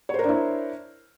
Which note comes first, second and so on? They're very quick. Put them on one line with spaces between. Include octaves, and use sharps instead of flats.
C#5 C5 A#4 D4 E4